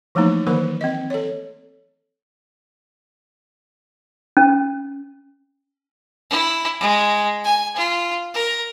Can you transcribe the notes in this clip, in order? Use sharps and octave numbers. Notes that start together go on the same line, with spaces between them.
E3 F3 A3 A#3 D#4 E4
D#3 E3 F#3 A#3 A#4 C5
C4 D#5
A4 C#5
C#4
E4
G#3
G#5
F4
A#4